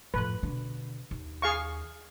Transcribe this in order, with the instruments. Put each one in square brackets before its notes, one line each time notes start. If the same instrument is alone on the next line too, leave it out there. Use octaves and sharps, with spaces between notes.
[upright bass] F2 A2 [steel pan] B4
[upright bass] B2 D3
D#2
[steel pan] G#4 F5 C#6